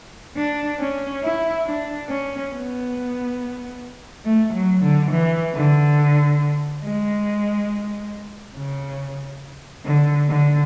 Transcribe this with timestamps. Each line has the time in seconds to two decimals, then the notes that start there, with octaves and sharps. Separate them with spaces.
0.37 D4
0.80 C#4
1.23 E4
1.66 D4
2.09 C#4
2.52 B3
4.25 A3
4.53 F#3
4.82 D3
5.11 E3
5.54 D3
6.84 G#3
8.56 C#3
9.85 D3
10.29 D3